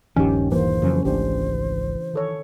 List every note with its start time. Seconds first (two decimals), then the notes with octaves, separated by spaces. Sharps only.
0.16 D#1 G2 D#3 F3 C#4 G4
0.52 E3 A#3 C5
0.82 F2 C#3 F#3 C#4
1.05 G#1 C#2 A3 D4 G4 C5
2.14 D#3 A4 C#5